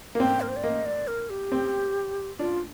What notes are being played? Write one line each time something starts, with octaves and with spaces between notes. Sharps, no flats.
A#3
C4 G5
A#4
C5
D5
A#3 D#5
D5
A#4
G4
C4
D4 F4